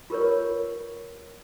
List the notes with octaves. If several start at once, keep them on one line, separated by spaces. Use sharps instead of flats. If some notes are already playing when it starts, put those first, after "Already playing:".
F4 G4 A#4 B4 C#5